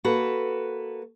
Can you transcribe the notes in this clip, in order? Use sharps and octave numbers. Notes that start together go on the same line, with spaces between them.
A#3 F#4 A4 B4